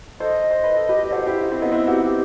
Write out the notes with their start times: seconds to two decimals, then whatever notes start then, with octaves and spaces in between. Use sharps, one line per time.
0.20 A4 C5 D#5
0.51 C5
0.64 B4
0.76 A4
0.89 G4 B4
1.03 G4
1.07 D#5
1.11 F#4 A4 C5
1.26 E4 G4
1.42 D#4 F#4
1.52 C4 E4
1.62 B3 D#4
1.72 C4 E4 B4
1.87 D#4 F#4 G4
2.02 G4